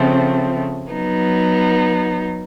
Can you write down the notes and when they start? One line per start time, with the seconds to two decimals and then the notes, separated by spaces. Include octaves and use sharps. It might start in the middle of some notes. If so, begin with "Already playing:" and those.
Already playing: C#3 F3 A3 C4
0.93 F#3 B3 D#4